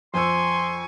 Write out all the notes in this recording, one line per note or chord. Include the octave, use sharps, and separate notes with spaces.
F2 C5 G#5 C6 C#6 E6